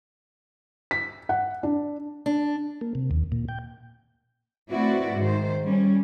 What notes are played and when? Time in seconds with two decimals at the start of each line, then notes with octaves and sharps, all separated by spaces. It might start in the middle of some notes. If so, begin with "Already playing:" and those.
0.91 B6
1.29 F#5
1.63 D4
2.26 D4
2.81 A#3
2.95 C3
3.11 D#2
3.32 A#2
3.48 G5
4.72 A3 C4 E4 F#4 B4 D5
5.15 G#2 D#3 C5
5.66 G3 C#4